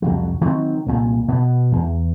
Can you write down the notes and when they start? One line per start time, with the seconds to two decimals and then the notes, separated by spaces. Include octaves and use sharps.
0.02 C2 F2 F#3
0.41 D#3 F#3 C4
0.86 C2 A#2
1.28 B2 B3
1.72 E2